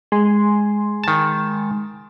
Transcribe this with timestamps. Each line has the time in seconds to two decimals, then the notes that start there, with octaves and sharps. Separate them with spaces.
0.12 G#3 G#5 C6
1.04 D#3 A5